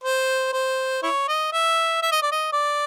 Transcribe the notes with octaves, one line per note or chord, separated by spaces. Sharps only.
C5
C5
E4 C#5
D#5
E5
E5
D#5
D5
D#5
D5